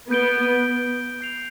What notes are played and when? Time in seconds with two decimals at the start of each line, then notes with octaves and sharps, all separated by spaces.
0.10 B3 G6 D7 G7
1.21 G6 C7 F7